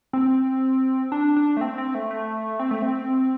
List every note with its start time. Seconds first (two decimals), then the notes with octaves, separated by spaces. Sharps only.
0.13 C4
1.12 D4
1.36 D4
1.57 A3
1.61 C4
1.78 C4
1.95 A3
2.11 A3
2.59 C4
2.71 A3
2.82 C4